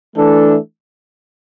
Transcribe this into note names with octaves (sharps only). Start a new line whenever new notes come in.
E3 A3 D4 A4